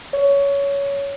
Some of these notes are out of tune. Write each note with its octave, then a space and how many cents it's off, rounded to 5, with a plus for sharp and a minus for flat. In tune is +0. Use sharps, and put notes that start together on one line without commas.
C#5 +15